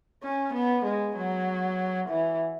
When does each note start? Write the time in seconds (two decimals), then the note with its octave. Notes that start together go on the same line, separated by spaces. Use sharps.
0.23 C#4
0.54 B3
0.85 G#3
1.16 F#3
2.09 E3